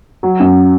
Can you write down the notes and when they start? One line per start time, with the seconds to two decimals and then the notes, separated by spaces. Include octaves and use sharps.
0.23 F#3
0.40 F#2